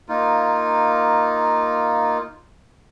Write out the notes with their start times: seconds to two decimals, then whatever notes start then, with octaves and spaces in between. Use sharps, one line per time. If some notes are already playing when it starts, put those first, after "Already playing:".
0.09 A#3 D#4 F4